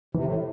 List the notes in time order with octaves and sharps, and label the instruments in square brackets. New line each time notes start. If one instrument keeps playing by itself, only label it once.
[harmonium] C3 [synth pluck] E3
[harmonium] A2